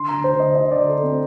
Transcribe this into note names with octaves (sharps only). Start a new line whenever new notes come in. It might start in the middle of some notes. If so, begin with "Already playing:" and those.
Already playing: D3 C6
A#5
D2
C5
D2
D#5
D3 D#5
D5
D2
A4
D2
C4